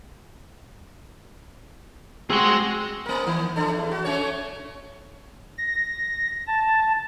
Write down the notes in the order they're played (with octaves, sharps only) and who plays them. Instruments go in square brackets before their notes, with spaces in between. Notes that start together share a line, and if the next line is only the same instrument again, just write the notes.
[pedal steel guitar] C4 F#4 [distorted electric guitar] G#4 C6
[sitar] A#3 A#4
D#3
E3 D4 A4
E2
F#4
A3 C#4 C#5
[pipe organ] A#6
A5